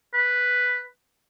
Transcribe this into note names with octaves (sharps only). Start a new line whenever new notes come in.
B4